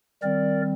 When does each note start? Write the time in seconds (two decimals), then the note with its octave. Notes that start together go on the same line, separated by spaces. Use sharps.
0.22 D#3 G3 C4 A#4 D5